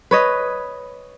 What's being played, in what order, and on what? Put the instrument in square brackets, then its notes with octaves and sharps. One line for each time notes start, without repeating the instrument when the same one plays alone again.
[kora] B4 C#5 D#5